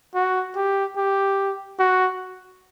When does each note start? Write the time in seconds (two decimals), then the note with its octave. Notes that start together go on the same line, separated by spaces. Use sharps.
0.15 F#4
0.56 G4
0.97 G4
1.79 F#4